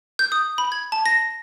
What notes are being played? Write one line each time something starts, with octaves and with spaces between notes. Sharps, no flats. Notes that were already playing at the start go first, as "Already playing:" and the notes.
G6
D#6
B5
G#6
A5
A#6